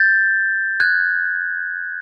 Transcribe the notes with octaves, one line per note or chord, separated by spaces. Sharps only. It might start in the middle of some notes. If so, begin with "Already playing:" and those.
Already playing: G6 A6
F#6 G#6